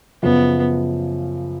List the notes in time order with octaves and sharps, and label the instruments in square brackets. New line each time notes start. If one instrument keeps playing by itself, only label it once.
[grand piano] F#2 C#3 F3 [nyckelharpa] B3